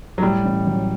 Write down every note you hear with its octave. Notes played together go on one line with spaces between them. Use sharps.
F#3
A2 G3
A1
F#3